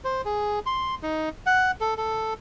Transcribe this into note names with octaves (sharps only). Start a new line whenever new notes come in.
C5
G#4
C6
D#4
F#5
A4
A4